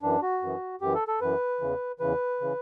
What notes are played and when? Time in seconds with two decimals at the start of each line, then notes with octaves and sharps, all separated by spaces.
0.03 F#2 E3 D4
0.22 F#4
0.42 F#2 E3
0.81 F#2 E3 G4
0.95 A4
1.08 A4
1.21 F#2 E3 B4
1.61 E2 C#3 E3
2.00 E2 C#3 E3 B4
2.41 C#3 E3